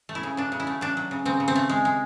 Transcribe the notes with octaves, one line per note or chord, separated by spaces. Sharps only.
A3
E4
C#3
F#3 D4
C#3
E4
A3
F#3 D4
F#3
C#3
C#3 C4
C#3
C4
A3
G#3
G#3